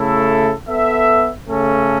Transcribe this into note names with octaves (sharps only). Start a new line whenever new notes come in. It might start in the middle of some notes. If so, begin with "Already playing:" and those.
Already playing: C#3 A3 E4 A4
B3 A4 E5
C#3 A3 C#4 A4